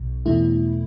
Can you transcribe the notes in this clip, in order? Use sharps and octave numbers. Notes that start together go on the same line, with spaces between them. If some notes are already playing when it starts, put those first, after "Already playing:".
Already playing: B1 B2
E2 B2 A3 E4